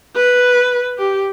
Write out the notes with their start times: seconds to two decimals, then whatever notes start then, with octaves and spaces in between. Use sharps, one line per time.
0.16 B4
0.98 G4